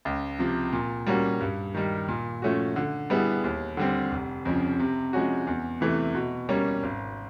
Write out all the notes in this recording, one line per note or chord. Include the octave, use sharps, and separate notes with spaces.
C#2
C3 F3
A#2
G3 A#3 C#4 F#4
G2
D#3 G3
A#2
F3 A3 C#4 F#4
D3
G3 B3 E4 G#4
D#2
D3 G3 C4
F1
F2 C#3 F3
C3
F3 G#3 C#4 F#4
E2
C3 E3 A3
B2
G3 A#3 C#4
G#1